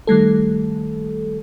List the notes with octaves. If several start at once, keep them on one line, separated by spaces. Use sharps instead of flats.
D#3 G3 A3 A4